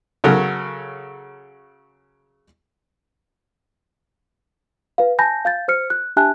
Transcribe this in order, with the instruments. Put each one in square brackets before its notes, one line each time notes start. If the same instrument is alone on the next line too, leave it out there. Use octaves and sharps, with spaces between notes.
[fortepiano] C#3 F#3 A4 A#4
[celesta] B4 F5
G#5 A5 B5 G6 A#6
F5 G6 A6
C5 F6 C#7
F#6
D4 G4 E5 G#5 A5 F#6